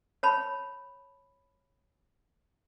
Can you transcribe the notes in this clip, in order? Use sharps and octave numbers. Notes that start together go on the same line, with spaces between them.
C#5 A5 B5